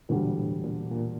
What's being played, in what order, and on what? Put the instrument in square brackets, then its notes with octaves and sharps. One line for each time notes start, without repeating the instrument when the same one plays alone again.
[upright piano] E1 D2 D3 G3 [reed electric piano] A#2
[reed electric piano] A2
A#2
A#2